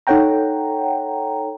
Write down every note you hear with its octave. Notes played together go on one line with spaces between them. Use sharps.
D#4 A4 C#5 F#5 G5 A#5